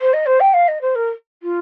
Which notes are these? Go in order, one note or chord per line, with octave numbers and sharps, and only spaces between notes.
C5
D#5
C5
G5
F5
D#5
C5
A#4
F4